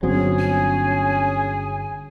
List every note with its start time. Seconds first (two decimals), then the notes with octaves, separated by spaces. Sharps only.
0.03 G1 F#3 C4 C#4 G#4
0.40 G#5